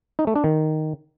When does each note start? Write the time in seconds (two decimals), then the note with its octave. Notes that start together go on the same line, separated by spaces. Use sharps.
0.19 D#4
0.27 A3
0.36 D4
0.44 D#3